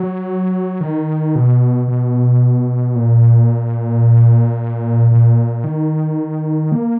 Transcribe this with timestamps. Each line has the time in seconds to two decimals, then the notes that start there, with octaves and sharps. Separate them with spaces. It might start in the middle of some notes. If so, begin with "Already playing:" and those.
Already playing: F#3
0.81 D#3
1.35 B2
1.88 B2
2.96 A#2
5.11 A#2
5.64 D#3
6.72 A#3